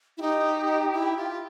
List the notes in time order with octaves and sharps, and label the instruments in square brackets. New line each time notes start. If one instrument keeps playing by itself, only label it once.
[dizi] E4
[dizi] D#4 [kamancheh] G4
[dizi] E4
F4